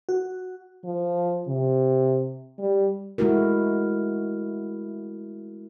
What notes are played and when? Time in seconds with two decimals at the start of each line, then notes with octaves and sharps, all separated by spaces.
0.09 F#4
0.84 F3
1.48 C3
2.59 G3
3.18 G#3 A3 E4 F#4 A#4